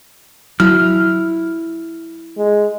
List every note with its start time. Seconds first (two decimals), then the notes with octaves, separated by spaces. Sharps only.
0.60 F#3 E4 F6
2.37 G#3